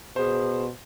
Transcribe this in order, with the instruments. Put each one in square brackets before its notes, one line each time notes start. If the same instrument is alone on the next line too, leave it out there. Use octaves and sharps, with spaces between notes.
[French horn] B2 [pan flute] G#4 [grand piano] C5